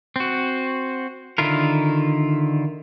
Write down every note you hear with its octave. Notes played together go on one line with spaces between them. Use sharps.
C4 F#4
D3 D#3 E4 F4 A#4